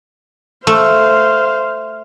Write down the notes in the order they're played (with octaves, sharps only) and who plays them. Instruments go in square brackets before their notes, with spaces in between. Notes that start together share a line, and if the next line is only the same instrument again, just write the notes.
[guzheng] A3 [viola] C5 F5